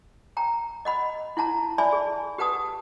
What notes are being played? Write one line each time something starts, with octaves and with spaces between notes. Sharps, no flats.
G5 A#5
D#5 F#5 B5
E4 F#5 A5 A#5
D5 E5 G#5 A5 B5
G#4
G4 B4 F#5 A5 D#6